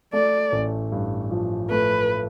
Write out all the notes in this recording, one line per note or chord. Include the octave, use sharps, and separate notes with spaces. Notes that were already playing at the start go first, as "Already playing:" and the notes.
A3 D5
A1
G2
F3
A3 B4